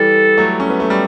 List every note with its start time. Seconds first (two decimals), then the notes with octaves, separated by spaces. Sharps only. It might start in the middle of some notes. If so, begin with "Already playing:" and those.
Already playing: E3 G3 A4
0.38 F#3 A3
0.60 C#4
0.70 B3
0.80 A3
0.90 G3